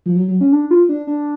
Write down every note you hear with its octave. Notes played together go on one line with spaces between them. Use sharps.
F3
F#3
F#3
C#4
D4
F4
D4
D4